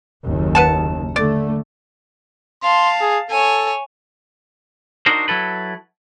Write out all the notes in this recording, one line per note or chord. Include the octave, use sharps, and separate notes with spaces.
F#1 D#2
B4 F#5 A5
D3 A3 D5
F5 A5 C6
G#4
A4 C#5 G#5
D4 D#4 F#4 A#4 C5
F#3 E4 A4 B4